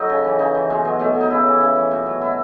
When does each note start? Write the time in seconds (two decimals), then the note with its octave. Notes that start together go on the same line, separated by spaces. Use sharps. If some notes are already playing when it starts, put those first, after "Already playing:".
Already playing: F#3 D#4 F#4 A4
0.09 C#3
0.24 E3
0.39 C#3 D#4
0.55 E3
0.70 B2 G#3
0.85 F#3 G#3
0.99 B2 A3
1.15 F#3
1.21 D#4
1.31 C#3 E4
1.46 E3
1.61 C#3
1.76 E3
1.91 B2
2.06 F#3
2.21 B2 E4